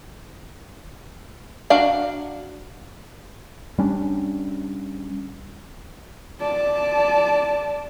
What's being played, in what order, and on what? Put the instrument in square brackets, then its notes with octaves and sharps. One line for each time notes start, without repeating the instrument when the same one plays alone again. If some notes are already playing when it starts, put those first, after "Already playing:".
[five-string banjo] D4 F#4 F5 A#5
[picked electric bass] G3 C#4 D4
[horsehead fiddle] D5 A5